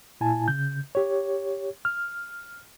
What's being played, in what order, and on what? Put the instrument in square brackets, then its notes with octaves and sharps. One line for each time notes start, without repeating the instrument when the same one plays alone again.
[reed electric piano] A#2 E4 G#5 A5
C#3 G6
G4 C#5
F6